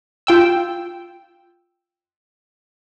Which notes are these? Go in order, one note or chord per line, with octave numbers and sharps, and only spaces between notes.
F4 G5 E6